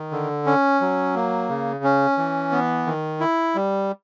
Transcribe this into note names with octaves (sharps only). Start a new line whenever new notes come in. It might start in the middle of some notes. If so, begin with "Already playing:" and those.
Already playing: D#3
D3
C#4
F#3
A#3
C#3
C#4
E3
B3
D#3
E4
G3